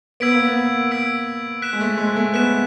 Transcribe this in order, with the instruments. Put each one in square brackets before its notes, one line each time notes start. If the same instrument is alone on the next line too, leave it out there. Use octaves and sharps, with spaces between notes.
[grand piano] B3 [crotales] E6 G#6 B6 D7
[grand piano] A#3
B3
[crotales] E6 G#6 B6 D7
F#6 B6 E7
[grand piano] G#3
A3
G#3
A3
[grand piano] B3 [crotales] F#6 B6 E7